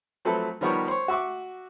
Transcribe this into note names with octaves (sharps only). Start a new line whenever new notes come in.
F3 F#3 A3 C4 A4 B4
D#3 F3 G3 B3 A#4 C#5
C5 C#5
F#4 E5 C#6 D6